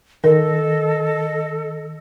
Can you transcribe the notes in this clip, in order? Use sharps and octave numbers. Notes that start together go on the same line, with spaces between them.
D#3 A4 A#4 D#5